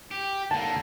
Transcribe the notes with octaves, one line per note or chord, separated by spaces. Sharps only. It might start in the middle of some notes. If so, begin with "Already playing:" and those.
G4
D3 A#3 A5